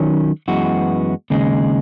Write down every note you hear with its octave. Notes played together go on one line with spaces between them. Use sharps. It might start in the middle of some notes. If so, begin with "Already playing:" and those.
Already playing: D#3 F#3 C#4
F#2 E3 G#3 B3 F#4
D#2 C#3 G#3